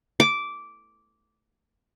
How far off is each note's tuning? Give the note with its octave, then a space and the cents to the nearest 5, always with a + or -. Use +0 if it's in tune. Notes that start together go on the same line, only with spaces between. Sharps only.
D6 -10